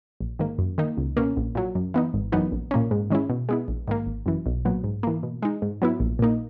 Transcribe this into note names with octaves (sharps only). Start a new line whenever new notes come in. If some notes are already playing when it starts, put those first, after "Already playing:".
A#1
G#2 D#3 A#3
F#2
D#3 A#3 D#4
C#2
B2 A#3 C#4
A#1
A#2 F#3
F#2
E3 B3 D#4
G#1
F#2 E3 B3 D#4
A#1
A#2 A#3 C#4
G#2
D#3 G#3 C#4 E4
B2
G#3 B3 E4
A#1
G#2 D#3 A#3
G#1
F#2 E3
B1
A#2 F#3 B3
G#2
E3 A#3
B2
G#3 D#4
G#2
F#3 B3 E4
A#1
A#2 A#3 D#4